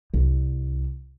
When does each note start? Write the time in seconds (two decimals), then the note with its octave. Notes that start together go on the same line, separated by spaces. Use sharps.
0.14 C2